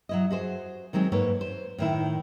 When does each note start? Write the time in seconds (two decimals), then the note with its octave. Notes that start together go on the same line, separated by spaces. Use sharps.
0.09 F#3 E4 D#5
0.30 F#4 G#4 C5
0.93 D#3 F#3 G#3 C4
1.12 G#2 A#3 A4 B4 C#5
1.41 C5
1.78 A2 D#3 E4